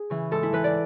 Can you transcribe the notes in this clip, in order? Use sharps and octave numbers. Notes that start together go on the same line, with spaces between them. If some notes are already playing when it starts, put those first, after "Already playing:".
Already playing: G#4
C#3 E3
G#2 A4
E4
E3 B4
D5